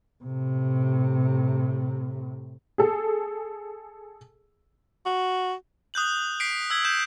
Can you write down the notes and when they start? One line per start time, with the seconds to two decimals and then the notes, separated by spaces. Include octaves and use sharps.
0.24 A2 C3
2.78 G#4 A4
5.06 F#4
5.94 D#6 F#6 G6 F#7
6.40 B6 C7 D7
6.70 E6 G#6 B6
6.85 G6 E7